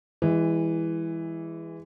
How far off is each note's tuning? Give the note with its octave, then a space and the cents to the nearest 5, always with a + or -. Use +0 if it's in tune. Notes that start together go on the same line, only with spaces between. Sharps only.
E3 +0 G#3 -30